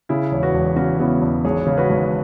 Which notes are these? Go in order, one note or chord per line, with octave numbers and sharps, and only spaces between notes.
C#3 E4 G#4
E1 C#5
F#4 B4
E1
C#3 C#4 F#4
C#3 B3 E4
E1
G#1 G#4 C#5
C#3
F#4 B4
G#1